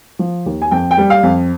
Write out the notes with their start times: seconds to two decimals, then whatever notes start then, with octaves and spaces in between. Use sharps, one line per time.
0.19 F3
0.46 D#2
0.62 G#5
0.71 F2 G5
0.91 G5
0.98 G3
1.10 F5
1.23 F2